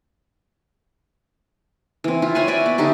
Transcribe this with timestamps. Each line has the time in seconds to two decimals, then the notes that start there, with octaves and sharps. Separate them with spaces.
2.04 E3 C4
2.22 E4 F4
2.35 C5 C#5 F#5 G#5
2.47 F#4 D5 E5 G#5
2.66 B3
2.78 D3 D#4 G4 E5